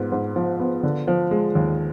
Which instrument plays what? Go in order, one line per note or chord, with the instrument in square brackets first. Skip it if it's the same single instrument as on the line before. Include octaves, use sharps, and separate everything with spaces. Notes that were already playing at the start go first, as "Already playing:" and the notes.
Already playing: [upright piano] G#2 F3 B3
G#2
F3
B3
D3
F3
G#3
D#2